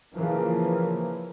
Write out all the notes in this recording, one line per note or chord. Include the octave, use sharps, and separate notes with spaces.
C#3 E3 F3 A#3